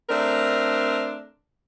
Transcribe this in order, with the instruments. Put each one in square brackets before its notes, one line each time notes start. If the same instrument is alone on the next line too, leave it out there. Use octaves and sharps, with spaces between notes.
[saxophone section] A3 C4 D4 A#4